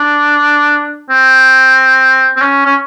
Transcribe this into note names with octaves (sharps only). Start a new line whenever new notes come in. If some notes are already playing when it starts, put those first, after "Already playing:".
Already playing: D4
C4
C4
C#4
C#4